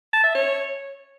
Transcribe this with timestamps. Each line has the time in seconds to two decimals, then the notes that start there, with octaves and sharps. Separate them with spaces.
0.13 A5
0.24 E5
0.35 C#5